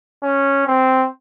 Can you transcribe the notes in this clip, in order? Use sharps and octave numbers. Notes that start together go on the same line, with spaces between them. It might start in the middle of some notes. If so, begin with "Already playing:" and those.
C#4
C4